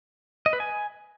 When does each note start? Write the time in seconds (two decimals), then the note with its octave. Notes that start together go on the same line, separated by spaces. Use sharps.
0.46 D#5
0.53 B4
0.60 G#5